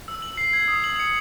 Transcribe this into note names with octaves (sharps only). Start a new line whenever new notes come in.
E6
F#7
C7
G#6
D#6
F#7
C#7